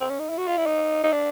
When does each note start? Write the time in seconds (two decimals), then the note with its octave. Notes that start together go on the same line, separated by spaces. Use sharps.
0.01 C4
0.10 C#4
0.19 D#4
0.29 E4
0.38 F#4
0.47 F4
0.57 E4
0.66 D#4
1.04 D#4
1.12 D4